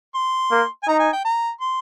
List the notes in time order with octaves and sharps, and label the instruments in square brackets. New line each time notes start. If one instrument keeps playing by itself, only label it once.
[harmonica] C6
[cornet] A#3
[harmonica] G#5
[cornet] D#4 [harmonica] A#5
[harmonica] G#5
G5
A#5
C6